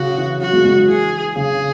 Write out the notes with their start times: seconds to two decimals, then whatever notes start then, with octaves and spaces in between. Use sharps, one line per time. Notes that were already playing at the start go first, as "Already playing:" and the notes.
Already playing: C#3 F#4
0.17 E3
0.41 F#3 F#4
0.53 G#3
0.65 G#3
0.76 F#3
0.88 E3 G#4
1.35 C#3 G#4